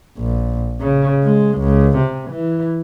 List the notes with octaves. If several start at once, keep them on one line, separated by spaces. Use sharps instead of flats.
A#1
C#3
G#3
C#2
C3
E3